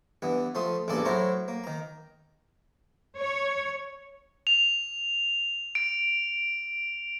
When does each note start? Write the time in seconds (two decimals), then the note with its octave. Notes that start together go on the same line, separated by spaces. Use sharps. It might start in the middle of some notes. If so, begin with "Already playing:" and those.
0.22 G2 E3 B3
0.55 F3 A3 C6 D#6
0.88 A1 E2 G2 A#3 A4 D5
1.05 A2 F#3 E4 C5 A#5 C#6
1.48 A#3
1.64 D#3 A#5
3.15 C#5
4.47 F7
5.75 D7